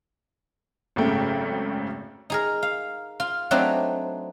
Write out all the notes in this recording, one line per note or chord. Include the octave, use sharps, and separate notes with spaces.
G#1 F#2 C#3 A3 G5
D#4 G#4 A#4
F5
F4
F#3 A3 C4 D4 D#4 B4